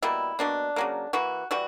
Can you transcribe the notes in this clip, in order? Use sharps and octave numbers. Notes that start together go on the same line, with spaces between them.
B2 G3 A#3 E4
B2 A#3 D4
C#3 F#3 A#3
E3 A#3 F#4
E3 G3 F#4